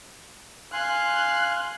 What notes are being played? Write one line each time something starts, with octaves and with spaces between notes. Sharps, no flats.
F5 G#5 C6 F#6